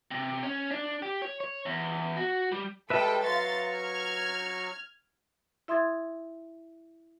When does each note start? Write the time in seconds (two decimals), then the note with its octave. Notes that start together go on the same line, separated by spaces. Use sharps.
0.11 C3
0.43 C#4
0.71 D4
1.02 G4
1.22 C#5
1.40 C#5
1.66 E2
2.17 F#4
2.52 G3
2.90 G3 G#3 A4 B4 E5 G5
3.23 F#3 F5 A#5 C6 C#6 A6
3.73 F6 G#6
5.68 E4 E5 C6 D#6 G#6 A6